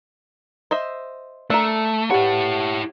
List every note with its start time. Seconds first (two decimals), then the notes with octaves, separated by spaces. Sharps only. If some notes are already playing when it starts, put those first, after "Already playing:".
0.71 C5 D#5 E5
1.50 A3 D4 A#4 E6
2.10 D4 E4 G4 B4 C#5 F#5